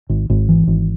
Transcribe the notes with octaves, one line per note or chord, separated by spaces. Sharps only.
G#1
G#1
E3
G#1